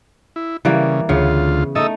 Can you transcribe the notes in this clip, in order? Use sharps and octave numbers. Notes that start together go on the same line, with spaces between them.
E4
C#3 E3 G3 A#3
D2 C#3 B3 F4
A3 D#4 A4 D#5 E6